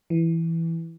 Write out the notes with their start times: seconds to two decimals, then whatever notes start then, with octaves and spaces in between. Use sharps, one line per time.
0.10 E3